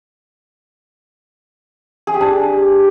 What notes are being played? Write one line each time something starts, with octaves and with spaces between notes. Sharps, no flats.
G#4
G4
D4